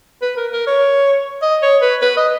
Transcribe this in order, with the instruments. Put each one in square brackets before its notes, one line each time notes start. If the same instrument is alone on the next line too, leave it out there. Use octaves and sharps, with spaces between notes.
[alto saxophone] B4
A#4
A#4
C#5
D#5
C#5
B4
B4
D#5